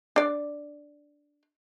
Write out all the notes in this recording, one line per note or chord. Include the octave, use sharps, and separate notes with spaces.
D4 D5